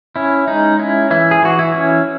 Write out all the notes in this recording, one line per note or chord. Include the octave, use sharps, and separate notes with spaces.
C#4 E4
G#3 D#4
C#4 E4
E3 E4
G#4
E3 F#4
E4
C#4